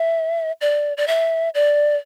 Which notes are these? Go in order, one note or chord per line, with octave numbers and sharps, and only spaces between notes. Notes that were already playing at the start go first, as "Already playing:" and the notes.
Already playing: E5
D5
D5
E5
D5